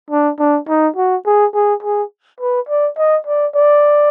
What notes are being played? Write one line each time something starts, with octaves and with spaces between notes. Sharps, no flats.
D4
D4
D#4
F#4
G#4
G#4
G#4
B4
D5
D#5
D5
D5